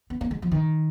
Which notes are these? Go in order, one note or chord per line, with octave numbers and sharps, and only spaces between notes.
B3
A#3
G#3
F3
D#3